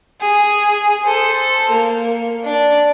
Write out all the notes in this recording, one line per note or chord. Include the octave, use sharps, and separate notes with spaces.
G#4
A4 C5
A#3
D4 D5